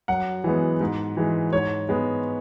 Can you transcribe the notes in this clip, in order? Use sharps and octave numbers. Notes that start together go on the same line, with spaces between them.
F#2 F#5
E3 G#3 B3
G#2
E3 G#3
G#2 C#5
G#3 B3